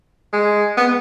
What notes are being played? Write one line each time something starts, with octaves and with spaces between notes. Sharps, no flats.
G#3
B3